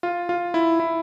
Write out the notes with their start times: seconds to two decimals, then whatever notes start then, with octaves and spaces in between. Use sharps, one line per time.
0.03 F4
0.29 F4
0.54 E4
0.80 E4